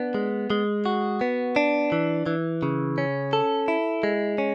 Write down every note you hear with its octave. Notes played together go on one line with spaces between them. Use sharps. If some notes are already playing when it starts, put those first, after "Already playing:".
Already playing: B3 D4
G#3
G#3
F#4
B3
D4
E3
E3
C#3
C#4
A4
E4
G#3
C#4